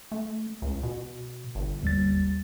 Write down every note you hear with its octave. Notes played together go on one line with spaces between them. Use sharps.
A3
C#2
B2
G1
D#2 G3 A6